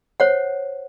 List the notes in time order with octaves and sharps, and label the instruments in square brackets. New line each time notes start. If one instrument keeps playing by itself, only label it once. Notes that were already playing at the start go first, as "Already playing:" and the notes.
[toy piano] C5 C#5 F#5